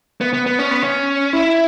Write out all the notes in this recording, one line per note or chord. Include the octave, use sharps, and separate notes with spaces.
B3
B3
B3
C#4
B3
C#4
E4